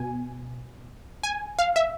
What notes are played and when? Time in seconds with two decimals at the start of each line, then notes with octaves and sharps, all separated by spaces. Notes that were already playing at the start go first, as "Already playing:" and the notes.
Already playing: B2 G#5
1.23 G#5
1.59 F5
1.76 E5